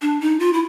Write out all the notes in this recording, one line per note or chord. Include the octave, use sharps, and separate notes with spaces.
D4
D#4
F4
E4